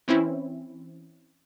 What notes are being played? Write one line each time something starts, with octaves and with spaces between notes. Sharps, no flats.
E3 C4 C#4 E4